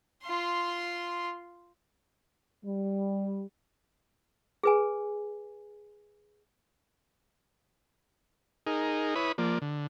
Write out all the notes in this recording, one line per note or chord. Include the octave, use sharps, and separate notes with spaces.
F4 C6
G3
G#4 B4 G#5
D#4 G#4 A#4
E4 B4 C#5 B5 D#6
F3 A#3 D5
D3